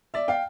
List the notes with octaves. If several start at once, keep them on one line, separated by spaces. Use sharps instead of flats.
D5 E5
F5 G5